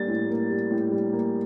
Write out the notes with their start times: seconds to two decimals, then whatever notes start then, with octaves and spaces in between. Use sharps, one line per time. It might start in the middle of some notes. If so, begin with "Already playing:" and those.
Already playing: G3 A#3 A6
0.08 A2
0.29 A#3
0.50 G3
0.71 A2
0.91 G3
1.13 A#3